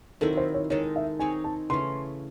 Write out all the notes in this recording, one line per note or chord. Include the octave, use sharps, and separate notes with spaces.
D#3 F#3 C4 E4 A4
C5
C#5
D#3 G#3 D#4 A4 C#5
E5
C4 D#4 G#4 C#5 G#5
A5
C#3 E3 A3 C#4 C6